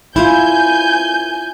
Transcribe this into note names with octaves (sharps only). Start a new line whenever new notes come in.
E4 F4 G#5 G6